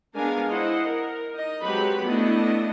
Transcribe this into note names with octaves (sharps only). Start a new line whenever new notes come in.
G#3 B3 D4 A#4 F5 G#5
E4 C5 D#5 F#5
A#4
D#4 D#5
F#3 G#3 C4 G4 B4 B5
A3 B3 D4 E4 D#5